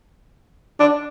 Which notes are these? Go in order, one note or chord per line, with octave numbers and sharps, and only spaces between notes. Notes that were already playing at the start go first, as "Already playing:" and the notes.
D4